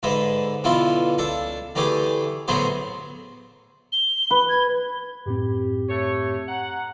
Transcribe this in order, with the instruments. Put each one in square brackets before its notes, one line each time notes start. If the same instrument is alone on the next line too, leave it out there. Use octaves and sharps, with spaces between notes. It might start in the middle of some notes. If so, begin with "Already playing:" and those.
[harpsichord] G#2 D3 G#3 B4 E5
B2 D3 E3 E4 F4
C#2 D4 A4
D3 E3 A3 G4 G#4
A2 D3 F#3 B3 G#4 C5
[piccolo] G7
[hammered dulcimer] B4
[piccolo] G#6
[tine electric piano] F#2 A2 C4 [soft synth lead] G4
[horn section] A3 C#5
[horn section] F#5 [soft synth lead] A#5